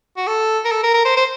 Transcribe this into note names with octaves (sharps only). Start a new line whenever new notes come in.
F#4
A4
A#4
A4
A#4
A#4
C5
C5